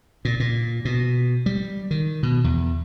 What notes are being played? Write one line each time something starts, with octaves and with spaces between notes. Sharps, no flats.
A#2
A#2
B2
G3
D#3
B2
E2